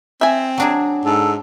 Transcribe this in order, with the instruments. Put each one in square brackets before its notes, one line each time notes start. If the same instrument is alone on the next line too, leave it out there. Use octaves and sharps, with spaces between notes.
[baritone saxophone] C4 [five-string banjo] E5 G#5
[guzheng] F#3 D4 G#4
[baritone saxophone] G#2 [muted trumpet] A4